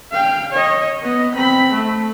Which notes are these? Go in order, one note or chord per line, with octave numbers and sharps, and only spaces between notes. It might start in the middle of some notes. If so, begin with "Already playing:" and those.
F5 G5
C#5 D#5
B3 D#5
C4 B5
A3